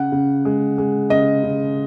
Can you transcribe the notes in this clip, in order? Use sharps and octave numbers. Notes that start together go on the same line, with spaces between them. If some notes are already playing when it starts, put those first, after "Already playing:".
Already playing: C#3 F#5
C#3
G#3
G#3
C#3 D#5
C#3